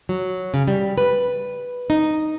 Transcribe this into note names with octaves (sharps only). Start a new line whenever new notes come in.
F#3
C#3
G3
B4
D#4